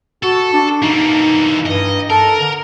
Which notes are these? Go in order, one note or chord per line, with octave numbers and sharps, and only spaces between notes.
F#4 A4
D4
E3 A#3 D#4
G2 D#5
A4 A#4
D3